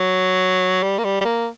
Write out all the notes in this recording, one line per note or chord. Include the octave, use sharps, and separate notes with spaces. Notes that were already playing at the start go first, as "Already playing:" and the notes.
Already playing: F#3
G3
A#3
G3
G3
A#3